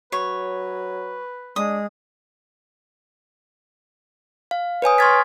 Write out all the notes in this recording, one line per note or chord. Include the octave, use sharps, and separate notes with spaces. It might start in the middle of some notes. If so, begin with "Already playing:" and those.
F#3 B4 C#5
G#3 D4 D#6
F5
B4 C#5 G#5 D#6
C6 C#6 F6 G#6 A6 B6